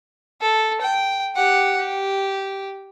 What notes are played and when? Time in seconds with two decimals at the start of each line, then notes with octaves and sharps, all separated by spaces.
0.41 A4
0.81 G5
1.35 G4 F#5
1.77 G4